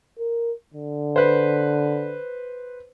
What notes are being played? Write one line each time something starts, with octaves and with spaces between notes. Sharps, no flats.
A#4
D3
B4 C5